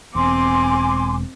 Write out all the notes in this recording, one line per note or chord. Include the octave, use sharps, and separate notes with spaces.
E1 C4 G#5 C6 D6